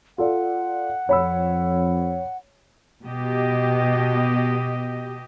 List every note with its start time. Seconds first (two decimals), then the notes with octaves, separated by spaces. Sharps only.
0.18 F4 A4 D5 F#5
1.09 F2 C#5 B5 E6
3.05 B2 G4 D#5